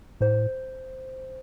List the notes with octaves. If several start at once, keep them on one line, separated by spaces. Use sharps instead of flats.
A2 C5